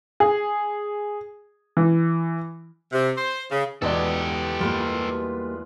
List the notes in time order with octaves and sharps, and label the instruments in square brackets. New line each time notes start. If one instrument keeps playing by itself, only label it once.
[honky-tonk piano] G#4
E3
[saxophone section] C3
C5
C#3
[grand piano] E2 D5 [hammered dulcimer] B2 G#3 B3 [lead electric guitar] G4 A4
[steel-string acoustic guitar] G3 A#3 [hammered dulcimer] F4 B4